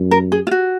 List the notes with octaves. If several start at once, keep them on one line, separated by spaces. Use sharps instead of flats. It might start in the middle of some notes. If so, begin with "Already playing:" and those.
Already playing: F#2
A#4
G#4
F4
F#4